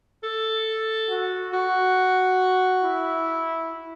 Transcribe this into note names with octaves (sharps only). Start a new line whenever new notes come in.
A4
F#4
F#4
E4